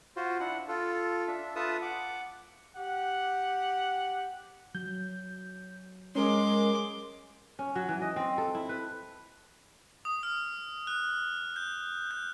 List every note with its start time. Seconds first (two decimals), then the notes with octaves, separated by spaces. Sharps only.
0.16 F4 F#4 C5
0.40 D4 E4 F#5
0.68 F4 A4
1.28 D4 E5
1.56 F4 A4 B4 E5 A5 D#6
1.82 F#5 D6
2.77 G4 F#5
4.75 F#3 G6
6.15 G#3 C#4 A#4 C6 D6
7.59 C#4
7.75 F#3
7.89 E3
8.02 D#5
8.16 C4
8.38 A4
8.55 E4
8.69 B4
10.05 D#6
10.23 F6
10.87 F#6
11.56 G6
12.11 G6